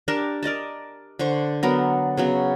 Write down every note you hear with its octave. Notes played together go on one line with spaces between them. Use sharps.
D4 G4 A#4 A5
A#4 D5 D#5 A5
D3 C5 C#6
F#3 B3 A#4
C#3 F#3 B3